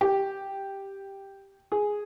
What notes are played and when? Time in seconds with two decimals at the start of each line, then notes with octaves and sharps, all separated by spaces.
0.01 G4
1.72 G#4